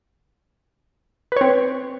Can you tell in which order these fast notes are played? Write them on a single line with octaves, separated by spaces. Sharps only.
B4 C#5 C4